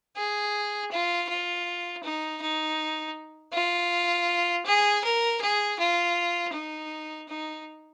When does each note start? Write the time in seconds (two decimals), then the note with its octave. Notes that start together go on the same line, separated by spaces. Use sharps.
0.16 G#4
0.92 F4
1.29 F4
2.04 D#4
2.41 D#4
3.54 F4
4.65 G#4
5.04 A#4
5.41 G#4
5.79 F4
6.53 D#4
7.29 D#4